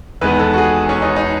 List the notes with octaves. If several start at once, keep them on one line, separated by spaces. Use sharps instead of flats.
E2 D#3 G#3 B3 B4
A4
F#4
G#4
C#4
D#4
D#4